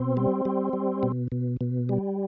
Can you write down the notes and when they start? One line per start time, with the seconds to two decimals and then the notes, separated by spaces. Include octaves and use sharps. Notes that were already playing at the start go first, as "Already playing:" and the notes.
Already playing: B2 C4
0.17 G3
0.45 G3
0.73 G3
1.03 B2
1.32 B2
1.61 B2
1.89 G3